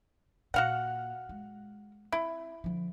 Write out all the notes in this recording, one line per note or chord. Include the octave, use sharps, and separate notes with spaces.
A#2 F#4 F5 F#5
G#3
C4 E4
D3 F3